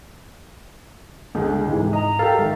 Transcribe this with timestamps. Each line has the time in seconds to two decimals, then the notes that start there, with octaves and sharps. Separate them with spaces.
1.35 C#2 D3 G#3
1.68 G#2 C3 E3 G#3
1.93 D#5 A#5
2.19 G4 A4 A#4 F5 A6
2.39 G#2 D#3 E5